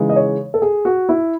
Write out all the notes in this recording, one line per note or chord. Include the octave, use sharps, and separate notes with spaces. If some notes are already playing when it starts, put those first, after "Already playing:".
Already playing: C#3 E3 G#3 D#4
D#5
C#5
A4
G#4
F#4
E4